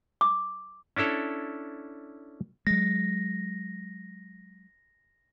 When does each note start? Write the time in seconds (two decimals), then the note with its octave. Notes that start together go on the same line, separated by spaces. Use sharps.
0.21 D6
0.96 C#4 D4 E4 A4 C#5
2.67 F#3 G#3 A#6